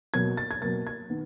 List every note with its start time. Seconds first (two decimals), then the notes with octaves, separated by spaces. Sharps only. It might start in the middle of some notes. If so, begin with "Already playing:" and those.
0.14 B2 F#3 A#3 G#6
0.37 A6
0.51 G#6
0.61 B2 F#3 A#3 A6
0.87 G#6
1.10 D#3 B3